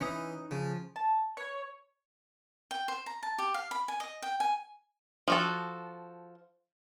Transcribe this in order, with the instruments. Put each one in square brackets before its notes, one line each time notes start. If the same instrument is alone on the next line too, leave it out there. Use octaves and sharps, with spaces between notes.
[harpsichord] E3 [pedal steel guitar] C#4 D#4 D#6
[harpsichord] C#3 [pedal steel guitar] F3
[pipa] A5
[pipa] B4 [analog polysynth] C#5
[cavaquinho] G5
C5
A#5
A5
G4
F5
B5
G#5
D#5
G5
G#5
[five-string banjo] F3 F#4 A4